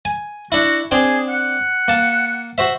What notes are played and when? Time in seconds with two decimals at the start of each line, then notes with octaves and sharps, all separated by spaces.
0.05 G#5
0.52 D4 E4 F#4
0.91 C4 D4 G#4 G5
1.29 F#5
1.88 A#3 A5
2.58 F#4 C5 E5